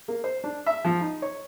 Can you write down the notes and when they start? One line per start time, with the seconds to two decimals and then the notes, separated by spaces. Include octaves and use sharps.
0.08 A#3
0.24 C5
0.44 D4
0.66 E5
0.85 F3
1.01 D#4
1.22 C#5